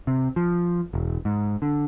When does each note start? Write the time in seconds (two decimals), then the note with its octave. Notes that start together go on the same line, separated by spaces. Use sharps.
0.07 C3
0.36 F3
0.93 E1
1.25 G#2
1.62 D3